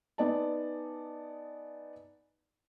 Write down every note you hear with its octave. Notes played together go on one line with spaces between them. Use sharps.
B3 D#4 D5 G#5 A5